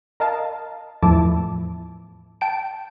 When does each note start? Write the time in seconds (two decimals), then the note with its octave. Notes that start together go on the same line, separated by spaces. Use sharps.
0.20 A#4 D#5 F5 A5
1.02 E2 A2 F3 E4 A5 D6
2.41 G5 A5 D7